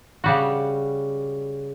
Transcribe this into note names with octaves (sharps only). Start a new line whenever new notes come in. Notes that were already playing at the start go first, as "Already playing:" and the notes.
C#3 G3 F#4